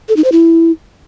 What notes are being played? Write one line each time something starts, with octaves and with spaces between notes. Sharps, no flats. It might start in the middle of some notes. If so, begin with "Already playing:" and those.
A4
D#4
C5
E4